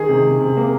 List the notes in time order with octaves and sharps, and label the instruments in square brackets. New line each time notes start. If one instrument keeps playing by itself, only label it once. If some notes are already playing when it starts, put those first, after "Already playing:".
Already playing: [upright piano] D#3 [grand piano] G#4
[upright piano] C3
C3
C3
A#3